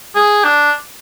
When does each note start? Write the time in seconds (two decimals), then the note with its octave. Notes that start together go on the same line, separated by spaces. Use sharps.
0.15 G#4
0.44 D4